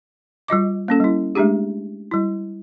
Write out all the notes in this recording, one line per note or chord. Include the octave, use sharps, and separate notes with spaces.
G3 F4 D#5 D6
A#3 C#4 A4
G3 E4
G#3 A3 D4 G4 G#4
G3 E4